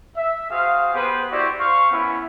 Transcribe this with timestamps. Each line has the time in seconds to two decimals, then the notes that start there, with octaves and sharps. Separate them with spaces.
0.16 E5
0.49 F#4 G#4 C5 F5
0.93 B3 G4 G#4 B4 C5
1.30 E4 F#4 G4 C5 D5
1.59 C5 F5 C#6
1.91 B3 C#4 E4